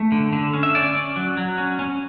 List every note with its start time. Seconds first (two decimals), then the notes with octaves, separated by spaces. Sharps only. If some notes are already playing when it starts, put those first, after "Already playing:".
Already playing: A3
0.12 D3
0.33 D3
0.53 C#4
0.63 E5
0.75 C#4 D5
0.95 C#4
1.16 F#3
1.37 F#3
1.58 C#4
1.79 C#4